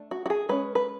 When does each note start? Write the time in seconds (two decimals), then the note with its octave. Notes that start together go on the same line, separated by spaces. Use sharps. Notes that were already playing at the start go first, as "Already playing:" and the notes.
Already playing: A3 D4
0.11 F#4
0.26 F#4
0.30 G#4
0.49 G#3 C#4 B4
0.75 B4